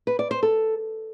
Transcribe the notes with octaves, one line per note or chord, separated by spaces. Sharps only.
B4
D5
C5
A4